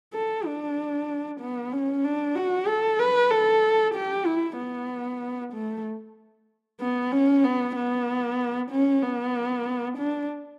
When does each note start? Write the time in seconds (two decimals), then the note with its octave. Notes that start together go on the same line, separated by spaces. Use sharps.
0.14 A4
0.45 D4
1.41 B3
1.73 C#4
2.04 D4
2.36 F#4
2.68 A4
2.99 B4
3.31 A4
3.95 G4
4.27 E4
4.59 B3
5.53 A3
6.81 B3
7.12 C#4
7.44 B3
7.75 B3
8.71 C#4
9.03 B3
9.98 D4